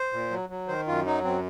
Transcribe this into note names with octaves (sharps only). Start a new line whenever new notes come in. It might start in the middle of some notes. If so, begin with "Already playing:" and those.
Already playing: C5
A#2
F#3
F#3
D#3 C5
F#2 F4
F#3 D#4
F#2 C4